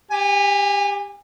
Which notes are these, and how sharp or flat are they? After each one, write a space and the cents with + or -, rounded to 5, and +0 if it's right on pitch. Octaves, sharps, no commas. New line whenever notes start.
G4 +15 G#5 -25